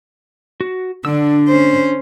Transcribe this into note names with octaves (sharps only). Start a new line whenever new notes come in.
F#4
D3 D4 E6
C#4 C5